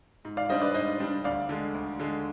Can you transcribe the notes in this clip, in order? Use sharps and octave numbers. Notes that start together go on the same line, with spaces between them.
G#2
D5 F5
G3 D4 C5 D#5
B4 D5
G#2 C5 D#5
G3 D4
D2 D5 F5
D3 G#3
D2
D3 G#3